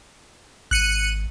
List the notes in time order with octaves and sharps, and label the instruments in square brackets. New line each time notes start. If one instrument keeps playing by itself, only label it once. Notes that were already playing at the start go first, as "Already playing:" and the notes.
[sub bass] G#1 [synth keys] F#6 C#7 D#7